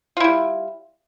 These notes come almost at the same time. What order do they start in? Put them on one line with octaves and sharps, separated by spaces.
F4 E4 G3